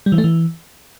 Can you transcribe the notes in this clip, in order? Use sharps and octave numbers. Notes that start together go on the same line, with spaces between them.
G3
E3
A3
E3